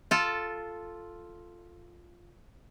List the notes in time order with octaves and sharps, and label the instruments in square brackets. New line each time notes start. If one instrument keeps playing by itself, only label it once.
[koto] F4 A4